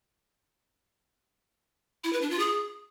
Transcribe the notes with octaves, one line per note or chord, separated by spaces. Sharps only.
E4
B4
D4
F4
G#4